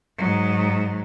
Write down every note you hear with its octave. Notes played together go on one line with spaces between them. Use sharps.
G#2 F#3